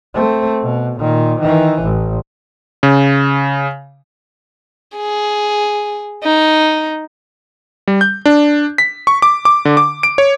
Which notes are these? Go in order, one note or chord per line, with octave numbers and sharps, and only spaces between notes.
A3 C4
B2
A#2 D#3
D#3 E3
A1
C#3
G#4
D#4
G3
G6
D4
B6
C#6
D6
D6
D3
D6
D7
C#5